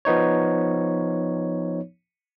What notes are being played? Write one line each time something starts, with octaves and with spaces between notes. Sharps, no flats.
F3 B3 D#4 C#5